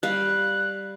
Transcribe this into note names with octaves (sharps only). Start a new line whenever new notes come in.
G3 F5 F#6